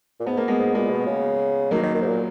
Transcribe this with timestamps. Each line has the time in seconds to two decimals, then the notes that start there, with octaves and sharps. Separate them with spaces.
0.20 A#2
0.26 G#2 B3
0.37 A#3
0.48 G#3 B3
0.59 G#2
0.74 A#2 G#3 B3
0.91 B2
1.07 C#3
1.71 D#3 F#3 A#3
1.83 D#3
1.95 D#3
2.02 G#2
2.08 A#2